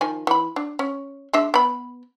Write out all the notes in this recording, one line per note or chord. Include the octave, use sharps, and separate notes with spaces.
D#3 F3 G#5
E3 B5
D4
C#4
G#3 D4 E5
B3 B5